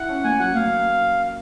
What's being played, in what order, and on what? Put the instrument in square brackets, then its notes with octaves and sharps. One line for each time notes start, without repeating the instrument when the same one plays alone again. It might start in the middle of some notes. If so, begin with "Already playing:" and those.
Already playing: [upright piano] E4 [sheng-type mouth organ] F#5
[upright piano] C#4
[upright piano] A#3 [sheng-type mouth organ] G#5
[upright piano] F#3 [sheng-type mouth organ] F#5
[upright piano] A#3 [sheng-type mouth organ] F5